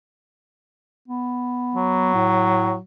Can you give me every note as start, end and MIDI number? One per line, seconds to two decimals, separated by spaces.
1.08 2.10 59
1.75 2.81 54
2.14 2.77 45